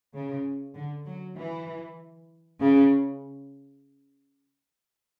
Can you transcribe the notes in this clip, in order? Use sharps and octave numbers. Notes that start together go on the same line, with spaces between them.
C#3
D3
F#3
E3
C#3